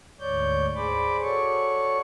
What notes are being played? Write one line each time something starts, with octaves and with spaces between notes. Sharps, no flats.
D2 G#2 C#5 D5 G6
G#4 C5 D5 B5 D6
F#4 A4 C#5 D5 C#6